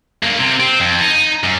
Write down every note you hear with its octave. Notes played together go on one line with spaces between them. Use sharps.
G2 A#3
C3
C4
F2
D#4
F#2